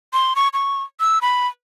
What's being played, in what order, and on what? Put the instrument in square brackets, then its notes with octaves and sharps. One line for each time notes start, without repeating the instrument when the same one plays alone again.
[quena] C6
C#6
C#6
E6
B5